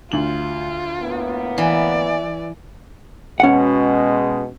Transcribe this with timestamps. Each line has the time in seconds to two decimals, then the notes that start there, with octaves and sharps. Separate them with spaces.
0.12 D2 F4 F#7
1.00 A2 A#3 B3
1.58 E3 D5
3.40 B2 G#3 C#4 F#5